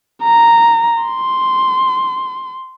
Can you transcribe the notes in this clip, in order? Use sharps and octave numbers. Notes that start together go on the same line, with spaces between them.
A#5
C6